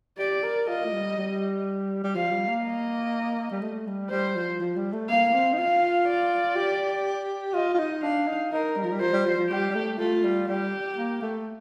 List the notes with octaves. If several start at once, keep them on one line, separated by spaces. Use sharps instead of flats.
G4 D5
A#4
F4 D#5
A3
G3
G3
G3
F3 F5
G3
A#3
D#5
G3
A3
G3
G3 C5
F3
F3
G3
A3
A#3 F5
C4
D#4
F4 F5
D5
G4
F4 D#5
F4
D#4
D4 F5
D#4
D#4 A#4
G3
F3
G3
F3 C5
G3
F3
F3
G3 G4
G3
A3
A3 F4
G3
G3 G4
A#3
A3